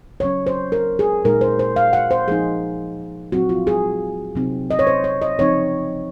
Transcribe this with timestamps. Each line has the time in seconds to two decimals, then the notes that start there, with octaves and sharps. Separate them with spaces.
0.20 C#3 F#3 C#4 C#5
0.47 C5
0.72 A#4
0.99 G#4
1.25 A#2 G#3 D#4 A#4
1.41 C5
1.59 C5
1.76 F5
1.93 F#5
2.11 C5
2.28 F3 A#3 D#4 G#4
3.32 A#2 F#3 C4 F#4
3.49 F4
3.67 G#4
4.35 C3 F#3 C4 D#4
4.71 D#5
4.79 C#5
4.87 C5
5.04 C#5
5.22 D#5
5.39 C#3 F3 C4 D#4 C#5